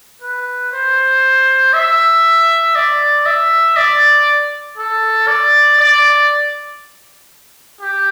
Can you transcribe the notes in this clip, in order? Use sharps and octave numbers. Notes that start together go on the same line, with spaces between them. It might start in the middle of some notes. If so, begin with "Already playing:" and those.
B4
C5
E5
D5
E5
D5
A4
D5
D5
G4